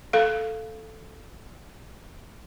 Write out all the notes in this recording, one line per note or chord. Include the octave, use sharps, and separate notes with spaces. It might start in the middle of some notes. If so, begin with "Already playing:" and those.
A4 F5